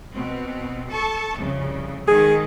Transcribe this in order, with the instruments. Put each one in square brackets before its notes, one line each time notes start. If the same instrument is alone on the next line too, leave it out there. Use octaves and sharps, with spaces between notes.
[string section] B2 C4
A4 A5 C#6
C2 F2 C#3
[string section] G#2 D#3 [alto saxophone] G#4